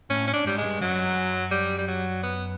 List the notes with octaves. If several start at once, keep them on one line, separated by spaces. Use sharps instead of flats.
A2 C#4
C#4
D4
G#2 G3
G#3
G2
F#2 F#3
G3
G3
F#3
B3